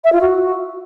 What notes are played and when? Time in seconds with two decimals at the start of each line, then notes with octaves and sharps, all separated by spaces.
0.04 E5
0.13 F4
0.21 F#4